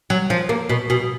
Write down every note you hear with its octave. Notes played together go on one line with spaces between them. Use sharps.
F#3
F3
A#3
B2
B2